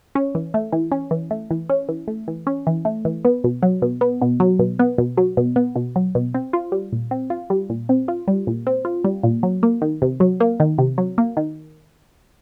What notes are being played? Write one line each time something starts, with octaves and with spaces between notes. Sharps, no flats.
C#4
E3
A3
E3
C#4
E3
A3
E3
C#4
E3
A3
E3
C#4
E3
A3
E3
B3
B2
F#3
B2
B3
B2
F#3
B2
B3
B2
F#3
B2
B3
B2
F#3
B2
C4
F4
G3
A#2
C4
F4
G3
A#2
C4
F4
G3
A#2
C4
F4
G3
A#2
F#3
A#3
D#3
C3
F#3
A#3
D#3
C3
F#3
A#3
D#3